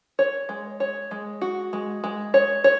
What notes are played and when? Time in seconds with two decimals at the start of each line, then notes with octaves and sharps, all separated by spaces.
0.19 C#5
0.49 G#3
0.80 C#5
1.11 G#3
1.41 F#4
1.73 G#3
2.04 G#3
2.34 C#5
2.64 C#5